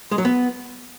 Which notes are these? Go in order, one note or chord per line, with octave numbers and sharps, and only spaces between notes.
G#3
F#3
B3